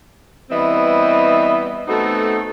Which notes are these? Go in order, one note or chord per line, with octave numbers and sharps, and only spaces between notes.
E3 G3 B3 C4 D#5 E5
A3 B3 C4 D#4 F#4 A4